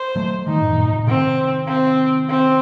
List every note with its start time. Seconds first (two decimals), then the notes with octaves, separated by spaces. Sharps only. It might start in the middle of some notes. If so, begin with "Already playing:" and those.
Already playing: C5
0.16 F#3 A3
0.47 D#3 G3 D#4
0.62 F#2 A2
0.78 G2 A#2
0.93 A2 C3
1.07 C3 D#3 C4
1.68 C4
2.29 C4